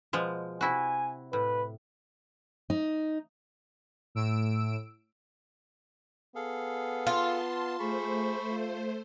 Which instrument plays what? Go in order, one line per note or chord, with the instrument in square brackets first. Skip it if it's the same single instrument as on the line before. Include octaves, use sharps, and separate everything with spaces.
[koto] B2 F3 G#3
[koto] C3 E4 F#4 [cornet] G#5
[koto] A2 [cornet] B4
[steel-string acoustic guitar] D#4
[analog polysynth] A2 E6 D7
[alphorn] B3 [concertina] G#4 A4 F5
[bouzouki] F4 [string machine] A5 C6
[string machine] A3 C5 [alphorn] G#4 [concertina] B5 C#6
[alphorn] F4